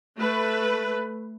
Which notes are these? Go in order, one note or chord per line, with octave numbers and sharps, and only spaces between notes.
A3 B4